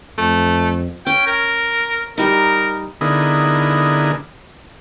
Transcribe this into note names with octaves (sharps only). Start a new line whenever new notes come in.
F2 A3
C#4 G5
A#4
G3 D#4 A#4
D3 B3 D#4 E4 G#4 A#4